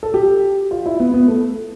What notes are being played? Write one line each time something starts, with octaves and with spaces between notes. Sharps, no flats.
A4
G4
F4
E4
B3
B3
A3